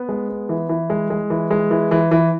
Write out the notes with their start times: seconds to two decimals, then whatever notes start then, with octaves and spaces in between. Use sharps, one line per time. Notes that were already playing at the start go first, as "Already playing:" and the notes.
Already playing: B3
0.09 G#3
0.29 B3
0.49 E3
0.69 E3
0.90 G#3
1.10 G#3
1.30 E3
1.50 G#3
1.71 E3
1.91 E3
2.11 E3